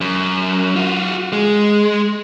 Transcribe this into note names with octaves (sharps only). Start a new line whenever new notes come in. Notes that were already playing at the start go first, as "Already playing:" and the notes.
F#2
F4 F#4
G#3